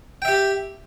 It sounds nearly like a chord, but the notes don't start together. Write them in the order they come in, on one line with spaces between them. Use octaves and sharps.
G5 E5 G4